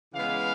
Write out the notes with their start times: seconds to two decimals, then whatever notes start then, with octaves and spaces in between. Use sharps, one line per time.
0.13 C#3 E3 G#3 B3 F5